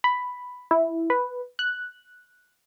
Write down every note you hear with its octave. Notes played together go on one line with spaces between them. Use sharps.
B5
E4
B4
F#6